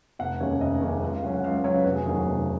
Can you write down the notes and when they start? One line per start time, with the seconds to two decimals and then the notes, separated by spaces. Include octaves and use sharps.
0.19 F1 F#5
0.40 D#2 C#3 G#3 C#5
0.61 F1 D#5
0.81 D#2 C#3 G#3
1.03 C#2
1.13 F5
1.22 C#3 F#3 C#4 F#5
1.34 F#5
1.44 C#2 F5
1.54 F5
1.64 C#3 F#3 C#4 C#5
1.74 B4
1.85 F1 F#4
1.95 G#4
2.06 D#2 D#3 F#3 G#4
2.16 F#4
2.26 F1